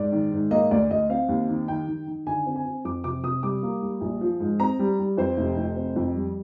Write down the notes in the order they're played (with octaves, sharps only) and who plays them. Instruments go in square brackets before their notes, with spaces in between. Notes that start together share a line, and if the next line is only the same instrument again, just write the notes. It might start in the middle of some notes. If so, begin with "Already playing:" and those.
Already playing: [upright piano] G#2 D5
D#3
G#2
A#3 D#5
D2 D5
D2 D#5
C4 F5
D#2
D#3
D#3 G5
D#3
D#3
D3 G#5
C4
G#5
C4
F2 D6
C3 D6
C3 D#6
G3 D6
A#3
G3
A#1
F3
G#2
C4 A#5
G3
G3
F2 C5
F1
F1
C4
F2
G3